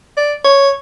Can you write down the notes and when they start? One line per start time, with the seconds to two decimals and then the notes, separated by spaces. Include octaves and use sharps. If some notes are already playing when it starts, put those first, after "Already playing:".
0.17 D5
0.44 C#5